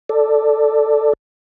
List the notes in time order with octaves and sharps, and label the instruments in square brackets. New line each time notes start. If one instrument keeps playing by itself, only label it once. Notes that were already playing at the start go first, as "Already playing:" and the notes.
[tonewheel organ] A4 D5